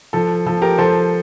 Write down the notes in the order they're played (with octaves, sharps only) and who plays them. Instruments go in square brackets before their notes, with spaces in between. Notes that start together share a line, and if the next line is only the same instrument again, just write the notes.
[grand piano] F3 A4
F3 A4
G4 A#4
F3 A4 C5